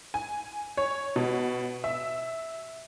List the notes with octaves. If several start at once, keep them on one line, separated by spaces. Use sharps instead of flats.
G#5
C#5
B2
E5